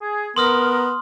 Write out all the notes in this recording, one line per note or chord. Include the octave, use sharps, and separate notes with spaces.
G#4
B3 A#4 C6 D#6 F6